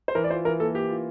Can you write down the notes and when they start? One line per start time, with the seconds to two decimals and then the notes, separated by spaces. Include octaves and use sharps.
0.08 C5
0.15 E3 A#4
0.24 D5
0.30 F4 C5
0.45 E3 A#4
0.60 A#3 A4
0.74 A#3 G4
0.89 F4